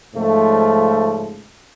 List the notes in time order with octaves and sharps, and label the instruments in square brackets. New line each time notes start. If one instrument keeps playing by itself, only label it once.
[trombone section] G#2 C#3 F3 A3